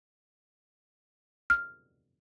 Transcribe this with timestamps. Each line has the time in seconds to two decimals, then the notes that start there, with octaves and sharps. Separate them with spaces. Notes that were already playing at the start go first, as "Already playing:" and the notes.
1.50 F6